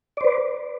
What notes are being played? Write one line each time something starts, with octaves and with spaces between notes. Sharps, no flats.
B4 C5 D5